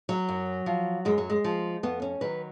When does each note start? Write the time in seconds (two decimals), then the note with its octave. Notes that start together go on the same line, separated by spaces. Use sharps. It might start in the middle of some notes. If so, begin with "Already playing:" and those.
0.09 F#3
0.29 F#2
0.66 F3
1.05 F#2 G#3
1.18 F#3
1.30 G#3
1.44 F3
1.83 F2 B3
2.02 C#4
2.21 D#3 F#3 B4